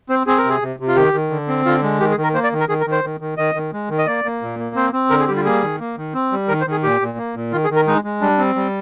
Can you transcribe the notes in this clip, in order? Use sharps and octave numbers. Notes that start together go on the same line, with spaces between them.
C4 C5
C4 G#4
A#4
C3
G#4
C3
C3
F4
D#3 G4
D#3
D3
C4
D3 F4
G#3
D#3 G4
G#4
D#3
A#4
A#3 C5
D5
D#3
A#4
D#3 G#4
A#4
D#3
C5
D#3
D#3
D#3 D#5
D#3
G#3
D#3
D#5
A#3 D5
A#3
A#2
A#3
C4 C5
C4
D3 A#4
G#4
G3 G4
F4
A#3 G#4
D#3
A#3
D#3
C4
G3
D#3 A#4
C5
D#3 G#4
A#2 G4
A#2
A#3
A#2
D#3 F4
G#4
D#3
A#4
G#3 D#4
G#3
G3 D4
C4
G3